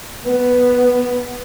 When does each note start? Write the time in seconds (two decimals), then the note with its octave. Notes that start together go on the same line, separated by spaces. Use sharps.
0.25 B3 B4